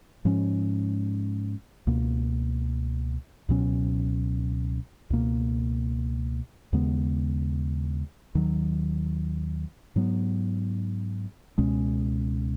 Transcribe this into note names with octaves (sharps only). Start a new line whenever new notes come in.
G#2 F3 G#3 C#4
C#2 B2 A#3
C#2 B2 F#3 C#4
C#2 B2 A#3
D#2 C#3 G#3 B3
D#2 D#3 F#3
G#2 F#3 B3
C#2 B2 G#3 C#4